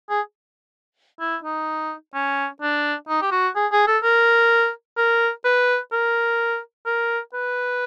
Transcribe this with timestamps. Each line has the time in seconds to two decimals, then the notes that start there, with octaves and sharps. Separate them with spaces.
0.10 G#4
1.20 E4
1.43 D#4
2.14 C#4
2.61 D4
3.09 D#4
3.22 G4
3.31 F#4
3.56 G#4
3.72 G#4
3.87 A4
4.03 A#4
4.97 A#4
5.45 B4
5.92 A#4
6.86 A#4
7.33 B4